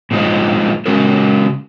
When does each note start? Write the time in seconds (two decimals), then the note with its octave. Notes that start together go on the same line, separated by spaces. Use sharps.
0.11 A#2 F3 G#3 D#4
0.86 C#3 G#3 C#4 F#4 A#4